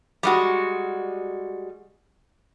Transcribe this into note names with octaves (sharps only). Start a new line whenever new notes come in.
G3 G#3 F#4